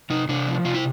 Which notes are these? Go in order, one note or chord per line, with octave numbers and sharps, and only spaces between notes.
C3 D#4
C3 D4
F3
C3 F4
E4